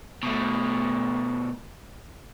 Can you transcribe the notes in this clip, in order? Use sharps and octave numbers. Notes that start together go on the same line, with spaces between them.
B2 A3